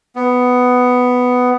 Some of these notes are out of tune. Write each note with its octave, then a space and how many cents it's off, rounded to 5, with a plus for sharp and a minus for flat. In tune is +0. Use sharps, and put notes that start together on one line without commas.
B3 +10